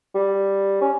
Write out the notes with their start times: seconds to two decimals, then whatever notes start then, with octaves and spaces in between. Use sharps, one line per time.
0.15 G3
0.81 C#4